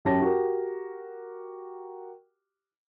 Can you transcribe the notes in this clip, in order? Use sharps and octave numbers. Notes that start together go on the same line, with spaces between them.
F#2 G4 C#5 A5 A#6
F#4 G4 A#4